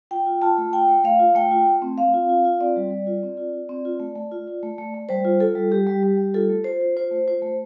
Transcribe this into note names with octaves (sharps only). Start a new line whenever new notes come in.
F4 G5
F4
F4 A5
A3
F4 G5
A3
A3 F5
F4
A3 G5
F4
A3
C4
C4 F5
F4
F4
F4
C4 D5
G3
G3
F4
C4
F4
F4
C4
F4
A3
A3
F4
F4
A3
A3
A3
G3 C5
F4
F4 A4
G3
G3 G4
G3
G3
G3
F4 A4
A3
F4 C5
F4
F4 C5
A3
F4 C5
A3